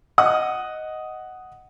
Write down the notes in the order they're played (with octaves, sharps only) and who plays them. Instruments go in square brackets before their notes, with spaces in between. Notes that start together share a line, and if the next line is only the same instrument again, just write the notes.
[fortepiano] D#5 F#5 D#6